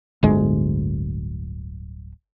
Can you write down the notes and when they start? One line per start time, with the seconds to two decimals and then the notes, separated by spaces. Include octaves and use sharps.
0.23 D1 G1 D2 G#3